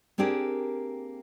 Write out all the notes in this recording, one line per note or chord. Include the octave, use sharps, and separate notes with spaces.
A#3 C4 D4 G4 G#4 A#4